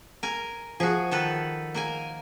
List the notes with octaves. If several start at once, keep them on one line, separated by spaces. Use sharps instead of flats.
A#4 G#5
F3 F#4 G#4
D#3 A4 B4
A#3 A#4 G#5